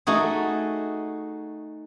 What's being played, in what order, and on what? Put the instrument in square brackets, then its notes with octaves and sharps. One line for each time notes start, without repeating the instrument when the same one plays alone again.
[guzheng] A3 D#4 F#4 G#4